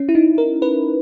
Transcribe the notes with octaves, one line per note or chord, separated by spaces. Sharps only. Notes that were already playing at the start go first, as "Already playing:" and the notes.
Already playing: C#4
E4
D#4
A#4
B4